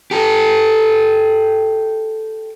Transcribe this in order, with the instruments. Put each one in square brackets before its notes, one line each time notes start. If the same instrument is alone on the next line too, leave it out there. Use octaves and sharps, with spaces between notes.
[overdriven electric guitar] G4 A4